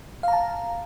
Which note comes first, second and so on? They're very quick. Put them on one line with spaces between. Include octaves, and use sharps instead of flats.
F5 A#5 A5